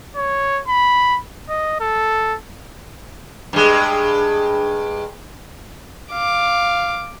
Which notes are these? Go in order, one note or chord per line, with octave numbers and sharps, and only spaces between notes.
C#5
B5
D#5
A4
G2 G#3
F5 D6